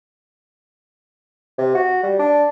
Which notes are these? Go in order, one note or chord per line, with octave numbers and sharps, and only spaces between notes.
C3
F#4
G3
D4